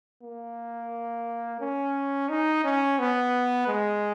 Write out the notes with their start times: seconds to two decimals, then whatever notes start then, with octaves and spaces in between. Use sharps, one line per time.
0.23 A#3
1.60 C#4
2.29 D#4
2.64 C#4
2.99 B3
3.68 G#3